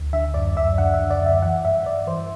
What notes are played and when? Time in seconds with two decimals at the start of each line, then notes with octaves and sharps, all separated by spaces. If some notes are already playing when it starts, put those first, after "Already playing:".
Already playing: D2
0.13 D3 E5
0.34 F#2 D5
0.56 F#2 E5
0.78 D3 F#5
0.94 E5
0.99 D3
1.10 D5
1.21 F#2
1.26 E5
1.42 E3 F#5
1.65 G2 E5
1.86 G2 D5
2.07 E3 C5